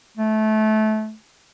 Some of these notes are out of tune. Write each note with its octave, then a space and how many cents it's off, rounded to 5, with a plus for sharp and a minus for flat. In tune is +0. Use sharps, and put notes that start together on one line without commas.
A3 -25